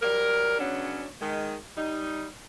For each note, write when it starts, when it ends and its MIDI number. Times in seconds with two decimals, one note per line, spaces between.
0.02 0.57 54
0.02 0.57 55
0.02 0.57 70
0.59 1.06 49
0.59 1.06 54
0.59 1.06 59
0.59 1.06 61
0.59 1.06 62
1.21 1.55 51
1.21 1.55 56
1.77 2.26 55
1.77 2.26 63